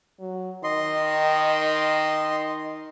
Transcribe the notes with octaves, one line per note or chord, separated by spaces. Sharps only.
F#3
D#3 D#5 C6